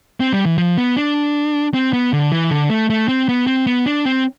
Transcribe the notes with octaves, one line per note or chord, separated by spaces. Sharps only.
C4
G3
E3
F3
B3
D4
C4
B3
D3
E3
D3
A3
A3
C4
B3
C4
B3
D4
C4